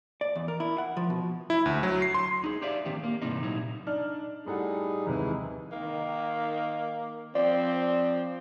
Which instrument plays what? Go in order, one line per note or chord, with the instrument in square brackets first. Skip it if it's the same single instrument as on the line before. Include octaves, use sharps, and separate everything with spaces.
[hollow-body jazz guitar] D5
E2
A#4
E4
F#5
F3
B2
[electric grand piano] E4
D2
F#3
C7
C6
[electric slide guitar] D#4 G#4
G4 C5 D5 E5 F5
A2 D#3 C4 G4
A#3
G#2 C3 E3 G3 C4 D#4
A#2 F#3 D#4 E4
[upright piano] D4 D#4 F6
[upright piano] A2 A4 F#5 [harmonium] G3 D#4 G#4
[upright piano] D#2 C3 [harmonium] E3 G#3 E4
[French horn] D#3 [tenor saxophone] A#3
[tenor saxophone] F3 [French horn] C4 [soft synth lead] D5